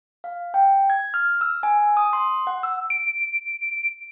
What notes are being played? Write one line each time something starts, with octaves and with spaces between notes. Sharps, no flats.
F5
G5
G#6
F6
E6
G#5
D#6
C6
F#5
E6
D7